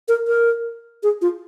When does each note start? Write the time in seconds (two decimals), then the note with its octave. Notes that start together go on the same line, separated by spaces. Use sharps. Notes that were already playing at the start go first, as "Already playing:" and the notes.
0.08 A#4
0.27 A#4
1.03 G#4
1.22 F4